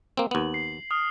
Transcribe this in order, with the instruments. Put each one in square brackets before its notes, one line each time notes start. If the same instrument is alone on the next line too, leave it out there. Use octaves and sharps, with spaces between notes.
[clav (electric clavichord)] A#3 C4
[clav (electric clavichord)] D#2 B3 [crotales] F#7
[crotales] C7
D#6 F6